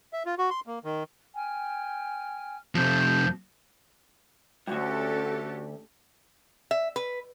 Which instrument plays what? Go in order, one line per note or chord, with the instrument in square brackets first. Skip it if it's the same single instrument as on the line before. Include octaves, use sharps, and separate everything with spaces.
[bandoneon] E5
F4
F#4
C6
A#3
D#3
[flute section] G5 G#5 F6
[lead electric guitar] F2 C3 [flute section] G6
[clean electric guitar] D2 G2 [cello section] C#4 G4 A4 [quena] F#4
[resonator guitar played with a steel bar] E5
B4